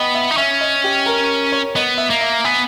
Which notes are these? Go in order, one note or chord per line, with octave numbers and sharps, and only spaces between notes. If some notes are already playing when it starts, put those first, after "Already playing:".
Already playing: B3 D#5 G5
E5
D#4
C#4 E5
D#5
G4
A#4
C#5
B3 D#5
E5
A#3
E5
B3 G#5